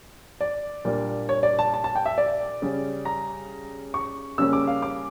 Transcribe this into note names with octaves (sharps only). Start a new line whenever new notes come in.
D5
A#2 G3 A#3 D4
C#5
D5
A5
A5
A5
G5
E5
D5
C#3 G3 C#4
A#5
C#6
C#3 G3 A#3 C#4 E6
D6
F5
D6